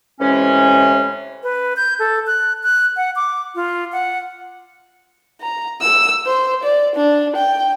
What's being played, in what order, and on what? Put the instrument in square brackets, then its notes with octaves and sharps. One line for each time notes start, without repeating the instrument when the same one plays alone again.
[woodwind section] A2 C3 E3 G#3 C#4
[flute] B4
G6
A4
F#6
F#6
F#5
D6
F4
F#5
[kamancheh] A#5
E6
C5
D5
D4
G5